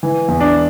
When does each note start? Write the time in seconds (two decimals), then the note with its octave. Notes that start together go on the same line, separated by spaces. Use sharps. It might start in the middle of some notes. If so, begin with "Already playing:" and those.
0.03 E3
0.28 E2
0.40 D4